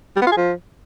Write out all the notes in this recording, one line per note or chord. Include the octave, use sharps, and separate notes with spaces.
G3
B3
F4
G#4
F3